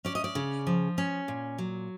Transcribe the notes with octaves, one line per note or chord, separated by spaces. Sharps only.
C#4 D5
D#5
D5
C#3
F3
C#4
A#2
F#3